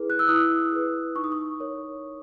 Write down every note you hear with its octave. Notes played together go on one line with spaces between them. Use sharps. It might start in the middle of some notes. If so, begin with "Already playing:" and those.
Already playing: E4 G#4 B4
F#6
E6
E4 D#6
G#4 B4
D#4 C#6
D#6
C#6
A#4 C#5